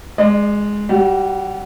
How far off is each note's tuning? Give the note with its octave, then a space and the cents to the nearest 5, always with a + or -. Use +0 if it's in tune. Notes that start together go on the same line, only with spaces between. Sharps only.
G#3 +0 D5 +40
G3 -25 F#4 +0